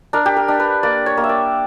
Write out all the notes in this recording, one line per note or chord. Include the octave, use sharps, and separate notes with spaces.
D4 A#4
G4
A#4
D4
B4
A#3 D5
C#5
A#3
E5
D5